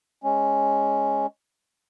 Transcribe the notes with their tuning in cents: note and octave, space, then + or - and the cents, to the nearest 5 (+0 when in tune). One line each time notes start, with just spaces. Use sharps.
G#3 +0 C#4 +0